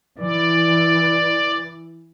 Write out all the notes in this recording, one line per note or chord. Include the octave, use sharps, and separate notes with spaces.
E3 D5